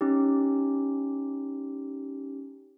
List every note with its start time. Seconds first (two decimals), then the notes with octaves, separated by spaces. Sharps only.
0.01 C#4 D#4 G4